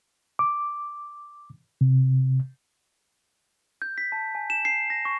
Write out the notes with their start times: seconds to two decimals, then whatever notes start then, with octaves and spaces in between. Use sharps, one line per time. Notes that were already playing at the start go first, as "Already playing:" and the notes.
0.39 D6
1.81 C3
3.82 G6
3.98 B6
4.12 A5
4.35 G#5
4.50 E7
4.65 C7
4.90 A#6
5.05 C#6